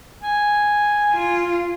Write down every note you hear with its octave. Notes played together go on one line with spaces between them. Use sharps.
G#5
F4